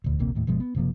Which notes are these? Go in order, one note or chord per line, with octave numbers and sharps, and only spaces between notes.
D#1 D2
D#1 A#1 C3 A#3
D#2 A2
G1 B2 F3 G#3
B3
F#1 C3 F3 A#3